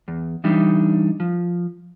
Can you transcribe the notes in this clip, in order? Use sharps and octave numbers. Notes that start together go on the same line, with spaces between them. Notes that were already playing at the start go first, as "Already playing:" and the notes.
E2
E3 G3 D4 D#4
F3